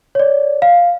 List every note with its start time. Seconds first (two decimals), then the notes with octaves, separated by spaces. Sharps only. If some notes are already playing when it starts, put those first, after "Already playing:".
0.15 C#5 D5
0.62 F5